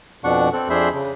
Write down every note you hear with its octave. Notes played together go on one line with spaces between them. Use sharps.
F2 B2 D4 F#5 C#6
C4 A4 F#6
F2 D4 G#4 C5 E5 B5
C#3